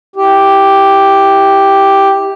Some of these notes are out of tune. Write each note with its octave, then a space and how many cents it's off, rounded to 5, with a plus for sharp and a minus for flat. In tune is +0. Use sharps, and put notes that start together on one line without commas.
E4 -25 G4 +0